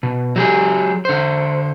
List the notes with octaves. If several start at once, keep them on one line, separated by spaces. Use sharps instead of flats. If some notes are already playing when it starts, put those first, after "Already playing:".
B2
F#3 G4 G#4
D3 C5